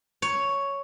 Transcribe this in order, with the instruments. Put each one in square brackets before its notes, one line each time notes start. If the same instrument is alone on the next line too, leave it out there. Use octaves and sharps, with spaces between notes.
[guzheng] C#5